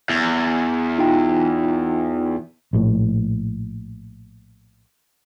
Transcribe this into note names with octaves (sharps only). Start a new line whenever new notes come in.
E2
D#4 F4 G5
A#1 A2